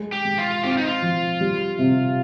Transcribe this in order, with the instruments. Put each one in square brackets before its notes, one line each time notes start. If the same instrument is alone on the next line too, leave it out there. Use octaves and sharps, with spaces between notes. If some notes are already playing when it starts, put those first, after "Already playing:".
Already playing: [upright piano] G#3
[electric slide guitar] G4
[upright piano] G#3
[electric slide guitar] F4
[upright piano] C4 [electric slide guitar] G4
[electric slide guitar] F4
D#4
F4
[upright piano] F3
G3
C3